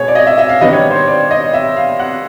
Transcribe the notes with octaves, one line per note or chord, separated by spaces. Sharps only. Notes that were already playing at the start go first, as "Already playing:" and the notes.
Already playing: B2 G#3 B3 G#4 C#5
D5
D#5
E5
E5
F5
D#3 G3 B3 D4 D#5
C#5
C5
C#5
D5
D#5
E5
F5
F#5